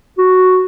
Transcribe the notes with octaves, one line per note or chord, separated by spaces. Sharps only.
F#4